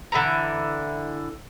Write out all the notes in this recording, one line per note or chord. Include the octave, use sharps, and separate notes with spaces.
D3 E3 E4 A#5